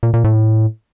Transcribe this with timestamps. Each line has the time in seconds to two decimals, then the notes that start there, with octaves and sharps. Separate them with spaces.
0.03 A#2
0.14 A#2
0.24 A2